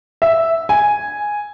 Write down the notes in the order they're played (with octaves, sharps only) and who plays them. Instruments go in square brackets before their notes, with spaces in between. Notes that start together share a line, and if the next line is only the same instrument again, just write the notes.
[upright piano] E5
G#5